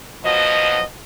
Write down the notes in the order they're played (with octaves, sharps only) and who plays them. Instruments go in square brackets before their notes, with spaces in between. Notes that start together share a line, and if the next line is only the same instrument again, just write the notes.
[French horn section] B2 F3 F#3 D#5